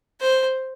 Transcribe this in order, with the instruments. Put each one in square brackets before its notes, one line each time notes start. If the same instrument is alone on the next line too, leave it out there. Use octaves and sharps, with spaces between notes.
[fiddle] C5